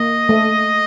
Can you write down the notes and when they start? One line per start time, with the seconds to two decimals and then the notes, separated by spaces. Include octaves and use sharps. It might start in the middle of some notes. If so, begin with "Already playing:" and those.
Already playing: A#3 D#5
0.29 A3